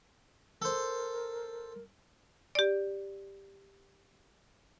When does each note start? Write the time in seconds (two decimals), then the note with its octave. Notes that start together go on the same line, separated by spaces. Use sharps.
0.62 A4 A#4 C5
2.55 G4 D5